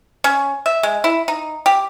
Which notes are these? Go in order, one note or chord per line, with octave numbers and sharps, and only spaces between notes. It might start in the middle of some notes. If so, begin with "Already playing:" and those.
C#4
E5
G#3
E4
D#4
G4